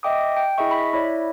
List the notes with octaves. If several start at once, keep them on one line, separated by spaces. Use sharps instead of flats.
D#5 E5 G5 D6 D#6
G5
E4 G#4 D#5 E5 C#6
B5 B6
E4 C#5 D5 E5